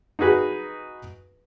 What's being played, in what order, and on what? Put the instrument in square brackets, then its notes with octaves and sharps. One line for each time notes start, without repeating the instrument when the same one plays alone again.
[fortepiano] D#4 F#4 G#4 B4